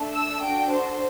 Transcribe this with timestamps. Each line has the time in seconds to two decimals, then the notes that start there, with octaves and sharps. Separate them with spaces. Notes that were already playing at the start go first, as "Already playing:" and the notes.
Already playing: A3 D4 A4
0.14 E6
0.42 D4 F#4 A4 G5
0.71 C5